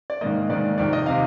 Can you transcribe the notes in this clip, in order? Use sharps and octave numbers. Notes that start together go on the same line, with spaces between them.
D5
G#2 D#3 A#3 D#5
G#2 D#3 A#3 D5
F2 C3 D#3 D5
D#5
C3 D#3 F5